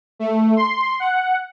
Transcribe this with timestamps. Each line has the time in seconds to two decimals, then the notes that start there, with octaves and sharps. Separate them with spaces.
0.19 A3
0.56 C6
1.00 F#5